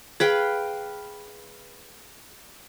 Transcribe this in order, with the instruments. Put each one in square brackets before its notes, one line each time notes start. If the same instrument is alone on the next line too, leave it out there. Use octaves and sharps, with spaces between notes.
[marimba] G#4 [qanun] B4 F5 G5